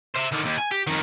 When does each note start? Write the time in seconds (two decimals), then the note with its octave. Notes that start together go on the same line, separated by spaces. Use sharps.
0.16 C5 E5
0.32 D3 D#3
0.46 D#2
0.58 G#5
0.72 G4
0.87 F2 D#3